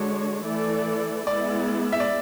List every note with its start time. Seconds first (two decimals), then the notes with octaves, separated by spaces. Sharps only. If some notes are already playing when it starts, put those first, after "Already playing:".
Already playing: D3 G#3 D4 F#4 C#5
0.45 E3 A3 E4 A4 D5
1.27 G#3 B3 E4 D5
1.92 E5
2.00 D5